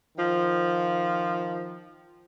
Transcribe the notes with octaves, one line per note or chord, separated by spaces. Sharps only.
D#3 F3